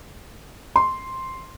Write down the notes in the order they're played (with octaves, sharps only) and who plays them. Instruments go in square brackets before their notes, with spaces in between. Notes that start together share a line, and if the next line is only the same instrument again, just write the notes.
[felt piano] C6